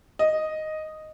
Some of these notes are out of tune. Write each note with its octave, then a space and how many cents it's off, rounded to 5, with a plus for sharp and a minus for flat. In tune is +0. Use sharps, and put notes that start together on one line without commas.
D#5 +0